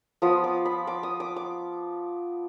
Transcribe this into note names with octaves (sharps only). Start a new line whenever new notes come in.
F3 B3 F4 D#6
D6
B5
D6
D#6
D6
D6